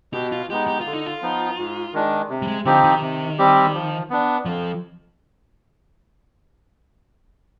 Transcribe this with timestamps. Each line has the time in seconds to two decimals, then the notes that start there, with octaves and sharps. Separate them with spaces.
0.13 B2 G4
0.32 F4
0.50 G#3 B3 D#4 G4
0.68 G4
0.81 D3 F4
0.93 D#4
1.06 F4
1.22 F3 B3 D#4
1.58 G#2
1.93 D#3 G#3 D4
2.29 C3
2.42 G3
2.47 G#3
2.65 D3 F3 C4 D#4 G4
2.84 D#3
3.01 C3
3.38 G3 C4 G4
3.74 F3
4.10 B3 D4
4.45 F2 F3